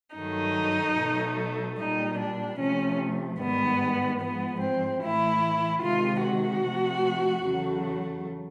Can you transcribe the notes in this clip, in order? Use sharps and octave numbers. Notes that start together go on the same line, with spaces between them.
G2 D#3 F#3 A3 D#4
B2 F#3 A3
A#2 G3 D#4
D4
C3 F3 A3 C#4
G#2 D#3 G3 B3
G#2 F3 G#3 B3
C4
A2 E3 A3 E4
C3 D#3 G#3 F4
F#4
C3 F3 A3
E2 C#3 F#3 A3